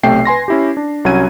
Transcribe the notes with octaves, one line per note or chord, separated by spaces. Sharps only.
B1 C3 A3 G5 C7
B4 G#5 C6 A#6
C#4 E4 G4
D4
C2 F#3 C#4 F#4 G#6 D#7